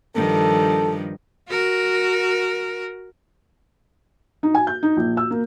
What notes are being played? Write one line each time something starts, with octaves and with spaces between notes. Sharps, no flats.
G2 D#3 F3 A4
F#4 A#4
D#4
G#5
G6
D#4
A#1
E6
A#3